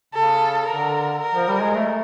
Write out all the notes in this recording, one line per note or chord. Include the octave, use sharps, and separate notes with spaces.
C#3 A4
D3 A#4
A#4
F3
G3
G#3
A3